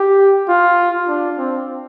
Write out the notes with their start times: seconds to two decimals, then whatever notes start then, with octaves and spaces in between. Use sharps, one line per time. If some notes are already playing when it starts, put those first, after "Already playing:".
Already playing: G4
0.49 F4
1.08 D4
1.38 C4